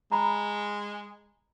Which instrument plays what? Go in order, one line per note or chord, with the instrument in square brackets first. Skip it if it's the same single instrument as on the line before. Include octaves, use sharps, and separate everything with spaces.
[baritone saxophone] G#3 [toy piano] A#5 B5